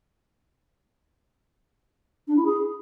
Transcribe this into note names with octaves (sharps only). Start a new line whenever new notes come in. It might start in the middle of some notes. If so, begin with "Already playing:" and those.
D4
E4
G#4